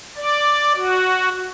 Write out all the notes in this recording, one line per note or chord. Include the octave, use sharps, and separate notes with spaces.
D5
F#4